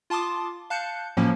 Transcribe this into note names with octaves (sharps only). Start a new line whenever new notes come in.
F4 A5 C6 D6 D#6
F5 A5 F#6 G6 C#7
A2 F3 F#3 A#3 C#4